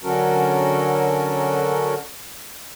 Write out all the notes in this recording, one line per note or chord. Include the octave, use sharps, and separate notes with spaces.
D3 F#3 C#4 F#4 A4 A#4